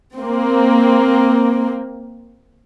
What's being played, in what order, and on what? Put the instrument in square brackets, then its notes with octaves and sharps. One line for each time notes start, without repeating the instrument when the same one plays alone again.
[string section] A#3 C4